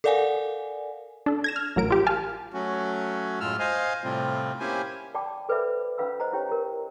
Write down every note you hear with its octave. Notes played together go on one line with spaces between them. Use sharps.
A4 A#4 D5 F5 F#5 G#5
D4 A4
G#6 A#6 E7
F6
A1 F#3 A#4 D7
F4 G4
F5 G#5 A5 F6
F#3 A3 C#4 F#4
F#2 A2 G#3 F4 E6 F6
C5 D#5 F5 G#5
A2 C3 G3 A3 C4 F4
A#3 C#4 E4 G4 C5 G#5
D5 G5 A5 B5 D6
A4 B4 C5 D5 E5 B5
C#4 F4 B4 F5 B5 E6
C5 D#5 A#5
E4 G4 C#5 G5
A#4 A#5